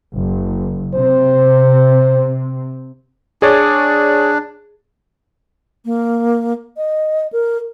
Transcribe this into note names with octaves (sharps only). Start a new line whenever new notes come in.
F#1
C3 C4 C5
D4 G#4 C#5 D5
A#3
D#5
A#4